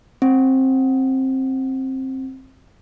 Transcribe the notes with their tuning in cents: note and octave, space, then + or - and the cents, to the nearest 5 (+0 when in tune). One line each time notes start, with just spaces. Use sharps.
C4 +15